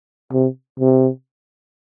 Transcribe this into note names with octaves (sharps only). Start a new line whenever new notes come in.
C3
C3